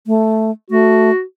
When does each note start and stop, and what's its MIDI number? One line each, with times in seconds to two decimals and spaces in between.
0.07 0.51 57
0.70 1.10 57
0.70 1.21 66